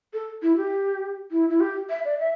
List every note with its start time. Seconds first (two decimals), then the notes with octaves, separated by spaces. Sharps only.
0.14 A4
0.42 E4
0.57 G4
1.31 E4
1.50 E4
1.60 G4
1.90 E5
2.05 D5
2.19 E5